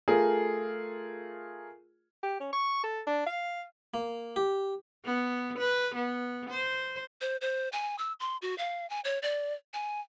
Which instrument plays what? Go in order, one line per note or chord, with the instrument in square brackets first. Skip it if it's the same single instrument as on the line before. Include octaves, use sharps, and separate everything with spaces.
[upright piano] A3 F4 G#4 A#4
[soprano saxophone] G4
C#4
C#6
A4
D4
F5
[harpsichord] A#3
G4
[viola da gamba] B3
B4
B3
C5
[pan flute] C5
C5
G#5
E6
C6
F#4
F5
G#5
C#5
D5
G#5